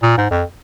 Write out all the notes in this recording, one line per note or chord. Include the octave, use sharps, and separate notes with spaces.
A#2
G#2
F2